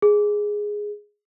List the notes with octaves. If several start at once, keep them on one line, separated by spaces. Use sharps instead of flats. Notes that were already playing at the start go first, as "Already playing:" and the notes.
G#4